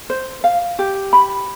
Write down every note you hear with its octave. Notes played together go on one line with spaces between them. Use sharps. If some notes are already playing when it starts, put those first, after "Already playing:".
C5
F5
G4
B5